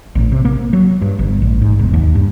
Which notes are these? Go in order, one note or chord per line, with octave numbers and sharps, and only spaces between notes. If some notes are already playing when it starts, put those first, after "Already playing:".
A1
C3
A#3
F#3
G2
G1
A1
G#2
E1
D#2
G2